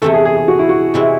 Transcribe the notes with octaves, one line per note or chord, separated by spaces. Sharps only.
E2 C3 E3 A3 A4
G#4
G#4
G#4
F#4
E4
F#4
C3 E3 G#3 C4 E4